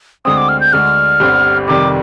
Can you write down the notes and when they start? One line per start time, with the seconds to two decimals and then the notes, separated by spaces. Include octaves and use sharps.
0.25 D2 D3 G#3 C4 D#6
0.37 D6
0.49 F6
0.61 G6
0.73 D2 D3 G#3 D4 F6
1.20 G1 G2 D3 G3 C4
1.68 F1 F2 D#3 G3 D6